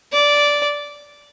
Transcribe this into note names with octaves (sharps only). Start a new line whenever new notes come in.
D5